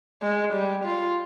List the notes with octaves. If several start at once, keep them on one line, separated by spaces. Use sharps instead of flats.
G#3
G3
F4